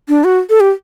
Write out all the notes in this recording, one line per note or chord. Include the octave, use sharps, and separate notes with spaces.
D4
F#4
A4
G4